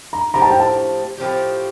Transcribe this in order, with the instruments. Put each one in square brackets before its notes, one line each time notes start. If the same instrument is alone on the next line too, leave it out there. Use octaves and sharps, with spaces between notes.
[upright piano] A#5
[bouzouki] A2 F3 C4 G4 [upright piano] A#5
[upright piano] A5
G5
A5
[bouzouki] A2 F3 C4 G4